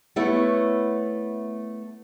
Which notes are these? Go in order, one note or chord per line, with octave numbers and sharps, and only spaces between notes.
A3 B3 E4 C#5